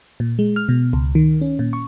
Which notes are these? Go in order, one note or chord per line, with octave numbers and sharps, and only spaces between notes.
A#2
G#3
F6
B2
C#2
D#3
C#4
A#2
C#6